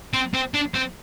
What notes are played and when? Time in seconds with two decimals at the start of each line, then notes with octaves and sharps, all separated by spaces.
0.14 C4
0.34 C4
0.54 D4
0.75 C4